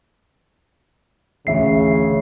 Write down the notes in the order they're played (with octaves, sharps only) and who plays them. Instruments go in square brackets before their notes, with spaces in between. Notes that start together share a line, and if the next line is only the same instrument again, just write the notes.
[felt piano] A1 D2 [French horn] C#3 [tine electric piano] E5 C7